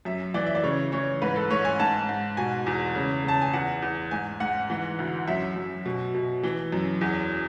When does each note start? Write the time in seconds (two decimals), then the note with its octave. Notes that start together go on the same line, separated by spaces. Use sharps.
0.05 F#2 E5
0.34 E3 D5
0.46 E5
0.55 D5
0.63 C#3 C#5
0.92 E3 C#5
1.22 G#2 B4
1.36 A4
1.50 G#2 C#5
1.65 G#5
1.80 G#2 A5
2.09 G#2
2.37 B2 G#5
2.66 E2
2.95 C#3
3.24 C#3 A5
3.41 G#5
3.53 E2 F#5
3.82 E2
4.11 G#2 G#5
4.40 G#2 F#5
4.70 E3
4.99 D2
5.28 F#2 E5
5.56 F#2
5.85 B2
6.14 B2
6.43 E3
6.72 F#2
7.01 E2